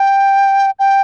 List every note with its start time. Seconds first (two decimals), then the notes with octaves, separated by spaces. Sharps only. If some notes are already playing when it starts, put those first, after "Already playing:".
Already playing: G5
0.79 G5